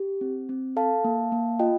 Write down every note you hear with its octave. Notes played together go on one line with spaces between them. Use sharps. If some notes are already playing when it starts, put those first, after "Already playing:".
Already playing: G4
C4
C4
A4 F5 A5
A#3
A#3
F4 D#5 G5